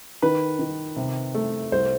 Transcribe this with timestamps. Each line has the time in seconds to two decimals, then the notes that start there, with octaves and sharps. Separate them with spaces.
0.22 D#3 B4
0.59 D#3
0.96 C3
1.34 A3
1.72 C2 C5